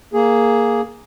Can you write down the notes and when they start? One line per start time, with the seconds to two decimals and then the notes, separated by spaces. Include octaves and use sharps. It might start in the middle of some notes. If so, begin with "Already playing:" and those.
0.13 A#3 G#4